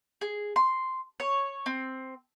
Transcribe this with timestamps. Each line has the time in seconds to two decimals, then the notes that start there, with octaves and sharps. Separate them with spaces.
0.21 G#4
0.56 C6
1.20 C#5
1.66 C4